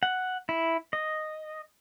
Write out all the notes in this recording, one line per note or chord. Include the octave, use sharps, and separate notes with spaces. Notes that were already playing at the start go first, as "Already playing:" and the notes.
F#5
E4
D#5